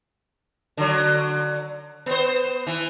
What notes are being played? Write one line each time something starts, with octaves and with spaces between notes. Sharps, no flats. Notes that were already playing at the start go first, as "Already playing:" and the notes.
D3 F#3
B3 C5
E3